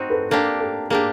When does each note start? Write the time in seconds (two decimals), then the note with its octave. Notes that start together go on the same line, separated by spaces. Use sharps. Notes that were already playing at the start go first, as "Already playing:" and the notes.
Already playing: C4 D#4 F#4 C5
0.10 A4 B4
0.31 A#3 D4 G4 A4
0.60 A4
0.90 A#3 D4 G4 G#4